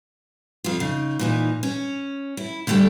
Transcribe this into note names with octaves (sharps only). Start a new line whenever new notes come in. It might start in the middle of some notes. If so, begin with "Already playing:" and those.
F2 F4
C#3 D#4
A#2 E3 D#4
C#4
E4
D3 G3 A3 A4 G5